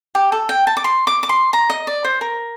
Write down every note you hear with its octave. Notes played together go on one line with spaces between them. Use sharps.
G4
A4
G5
A5
D6
C6
D6
D6
C6
A#5
D#5
D5
C5
A#4